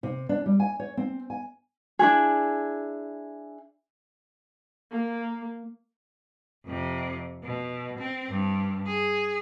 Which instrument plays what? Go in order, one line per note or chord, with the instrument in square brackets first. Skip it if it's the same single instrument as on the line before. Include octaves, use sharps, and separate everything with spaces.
[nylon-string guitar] C3
D4
G3
G#5
C#5
C4
G#5
[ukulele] D4 E4 F#4 G#4
[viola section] A#3
[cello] F2 C3
B2
C4
G2
G#4